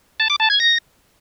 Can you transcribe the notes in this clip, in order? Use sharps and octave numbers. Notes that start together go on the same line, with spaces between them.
A5
D6
A5
G#6
A#6